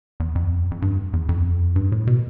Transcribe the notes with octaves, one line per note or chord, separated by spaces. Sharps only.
E2
F2
F2
G2
E2
F2
G2
A2
B2